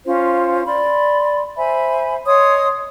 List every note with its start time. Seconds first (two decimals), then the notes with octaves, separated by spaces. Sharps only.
0.06 C#4 F4 C5
0.66 D5 B5 C6
1.57 C5 E5 G#5 B5
2.26 C#5 D#5 C6 D#6